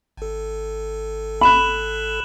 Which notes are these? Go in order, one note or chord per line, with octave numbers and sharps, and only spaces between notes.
G#1 A4
B5 F#6 E7 F#7